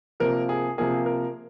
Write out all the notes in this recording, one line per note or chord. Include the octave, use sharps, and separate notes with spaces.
C3 F3 A#3 A#4
G#4
C3 F3 A#3 G#4
A#4